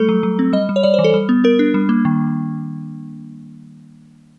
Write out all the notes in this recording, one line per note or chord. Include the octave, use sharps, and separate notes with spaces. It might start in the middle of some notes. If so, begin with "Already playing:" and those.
Already playing: G3 A3 A4
F#3
F#3
C4
G3 D#5
G3
C#5
G3 D5
C5
E3
A4
G3
B3
B3 A#4
D4
G3
A#3
D#3